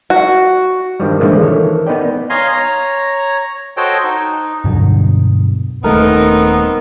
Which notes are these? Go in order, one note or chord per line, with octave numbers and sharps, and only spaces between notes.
F#4
G2 D#3 F3 G3
A#2 D3 E3 F3 G#3
D#3 E3 A4 C#5
B3 D#4 B4 D5 G5
C#5 D#5 F5 G#5 A#5 C6
C#5 A#5
F#4 A4 C5 C#5 D#5 G5
D#4
G2 B2 D3 F#3
D#1 A3 B3 C4 D#4 A#4